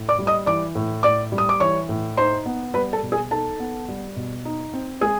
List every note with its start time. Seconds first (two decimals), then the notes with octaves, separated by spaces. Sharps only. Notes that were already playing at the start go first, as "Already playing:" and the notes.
Already playing: A2
0.09 D5 D6
0.19 G3
0.27 D#5 D#6
0.46 E3 D5 D6
0.75 A2
1.03 A2 D5 D6
1.32 G3
1.38 D#6
1.49 D6
1.60 E3 C#5 C#6
1.89 A2
2.17 D#4 C5 C6
2.46 B3
2.74 G3 B4 B5
2.93 A4 A5
3.03 B2
3.12 G#4 G#5
3.31 D#4 A4 A5
3.60 B3
3.88 G3
4.16 B2
4.45 D#4
4.73 C4
5.01 G#3 G#4 G#5